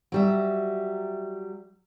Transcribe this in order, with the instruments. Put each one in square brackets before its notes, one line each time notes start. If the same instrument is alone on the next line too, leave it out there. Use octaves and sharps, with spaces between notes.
[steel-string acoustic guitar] F#3 G3 E5